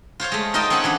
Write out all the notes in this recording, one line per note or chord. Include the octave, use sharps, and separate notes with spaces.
F4 C5 C#5 F5
G#3 A3
D#4 F4 A#4 D#5 G5 A5
C4 C#4 A4 C#5 F#5 G#5
E3 C#4 D4